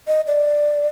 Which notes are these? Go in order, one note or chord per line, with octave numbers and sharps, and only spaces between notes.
D#5
D5